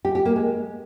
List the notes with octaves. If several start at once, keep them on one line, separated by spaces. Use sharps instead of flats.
G4
G4
A#3
G#3